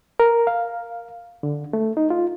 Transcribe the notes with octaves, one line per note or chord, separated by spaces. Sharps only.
A#4
F5
D3
A3
D#4
F4